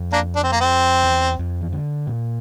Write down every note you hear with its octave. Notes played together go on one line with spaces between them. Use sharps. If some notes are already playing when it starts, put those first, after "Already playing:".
Already playing: F2
A#3 D4
D4
C4
A#3
C4
E2
F2
E3
D3
A#2